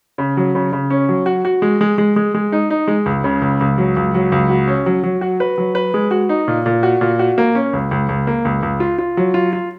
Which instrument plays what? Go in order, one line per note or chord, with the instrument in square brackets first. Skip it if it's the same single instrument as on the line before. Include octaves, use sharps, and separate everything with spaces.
[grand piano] C#3
F#3
C#3
C#3
C#4
F#3
F#4
F#4
G#3
G#3
G#3
G#3
G#3
D#4
D#4
G#3
C#2
C#3
C#2
C#2
F#3
C#2
F#3
C#2
F#4
C#4
F#3
F#3
F#4
B4
F#3
B4
G#3
F#4
D#4
A#2
A#2
F#4
A#2
F#4
A#3
C#4
C#2
C#2
C#2
A#3
C#2
C#2
F4
F4
F#3
F4
F4